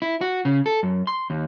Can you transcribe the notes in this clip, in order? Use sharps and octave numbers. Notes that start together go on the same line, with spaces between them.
E4
F#4
C#3
A4
F#2
C6
D#2